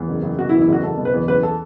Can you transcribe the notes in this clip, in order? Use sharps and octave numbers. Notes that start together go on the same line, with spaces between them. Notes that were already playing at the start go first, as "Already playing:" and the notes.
Already playing: E2
F#1
F#1
B2 F#4
E4
E2
E4
F#1 F#4
F#1 A4
B2
B4
E2
F#1 B4
A4